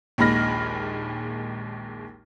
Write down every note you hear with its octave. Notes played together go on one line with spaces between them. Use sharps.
A#1 D#2 G#3 B5 F6 A#6